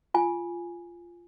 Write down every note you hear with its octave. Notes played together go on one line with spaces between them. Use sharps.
F4 G#5